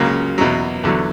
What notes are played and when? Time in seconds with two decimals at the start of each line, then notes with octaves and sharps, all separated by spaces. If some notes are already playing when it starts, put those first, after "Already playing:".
Already playing: C#2 C#3 F#3 A#3
0.38 E2 B2 F#3
0.83 E2 D3 F#3